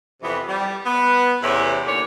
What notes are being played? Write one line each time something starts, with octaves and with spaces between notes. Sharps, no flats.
F2 C3 E3 B3
G3
B3
E2 A2 C3 C#4 E4
D#2 D3 C#5 D5